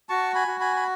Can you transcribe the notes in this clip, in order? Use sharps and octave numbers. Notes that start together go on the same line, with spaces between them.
F#4 A5 C#6
G#5 B5
F#4
G#5 B5
B5